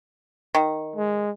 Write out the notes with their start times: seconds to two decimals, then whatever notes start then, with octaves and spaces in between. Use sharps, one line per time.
0.55 D#3
0.96 G#3